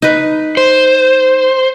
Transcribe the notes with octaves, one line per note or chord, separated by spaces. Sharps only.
D#4 B4
C5